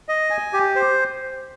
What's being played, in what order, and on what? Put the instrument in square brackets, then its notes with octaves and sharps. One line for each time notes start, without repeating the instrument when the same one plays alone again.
[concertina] D#5
G#5
G4
C5